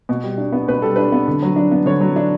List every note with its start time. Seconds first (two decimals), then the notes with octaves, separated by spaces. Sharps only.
0.09 B2
0.24 G3
0.38 D4
0.52 B3
0.68 B2 B4
0.82 G3 A4
0.96 D4 B4
1.12 B3
1.28 D3
1.42 F#3
1.56 D4
1.71 B3
1.86 D3 C#5
2.01 F#3
2.16 D4